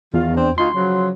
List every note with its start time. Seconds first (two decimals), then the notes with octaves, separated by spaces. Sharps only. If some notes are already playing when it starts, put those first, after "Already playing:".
0.14 E2 D#3 F4
0.36 C4 D4
0.58 D2 D#4 F4 C6
0.74 C#3 F3 F#3